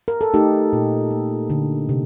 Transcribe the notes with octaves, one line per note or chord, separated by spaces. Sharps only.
A#4
A4
A3 D#4 G4
A#2
A#3
D3
C3